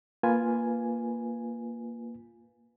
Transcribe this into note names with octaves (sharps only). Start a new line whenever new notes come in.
A#3 F4 B4 G#5